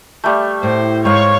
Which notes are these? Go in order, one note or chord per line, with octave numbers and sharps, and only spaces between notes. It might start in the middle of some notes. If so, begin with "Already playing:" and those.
G3 A3
A2 C5
G#2 C5 C#5 F5 C#6